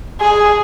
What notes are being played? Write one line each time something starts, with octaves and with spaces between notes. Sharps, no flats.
G#4